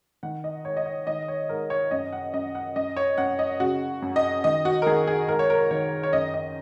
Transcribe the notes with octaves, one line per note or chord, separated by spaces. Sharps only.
D#3 F#5
D#5
G#2 C#5
D#5
C#5
D#3 D#5
C#5
G#2 A#4
C#5
F#2 D#5
F#5
F#2 D#5
F#5
F#2 D#5
C#5
F#2 F#5
D#5
C#3 F#4
F#2
D#5
D#3 D#5
F#4
A#4
D#3 G#4
G#4
G#2 A#4
C#5
A#4
D#3 C#5
C#5
F#2 D#5
D#5